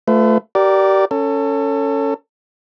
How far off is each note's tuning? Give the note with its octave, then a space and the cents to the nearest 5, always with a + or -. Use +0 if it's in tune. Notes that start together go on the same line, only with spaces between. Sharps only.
A3 +0 F4 +0 B4 +40
G4 -30 A#4 +0 D5 +0
C#4 +0 A4 +25